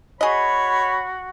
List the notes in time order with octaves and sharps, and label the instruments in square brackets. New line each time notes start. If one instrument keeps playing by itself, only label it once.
[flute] F#4 [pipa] G#4 D#5 [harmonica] C#5 [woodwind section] B5